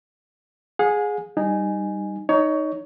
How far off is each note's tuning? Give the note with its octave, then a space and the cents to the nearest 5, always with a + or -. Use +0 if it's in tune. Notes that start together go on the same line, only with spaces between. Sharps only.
G#4 +0 F#5 -45
G3 +0 D#4 -15 G#5 +0
D#4 +0 C#5 +25